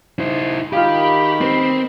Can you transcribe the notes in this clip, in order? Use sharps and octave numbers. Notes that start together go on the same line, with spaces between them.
D#4 E4 C5
D#3 F4 G4 G#4 F5 B5
C4 B4